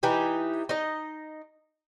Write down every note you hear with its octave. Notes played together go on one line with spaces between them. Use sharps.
E3 D#4 G4
D#4 D#5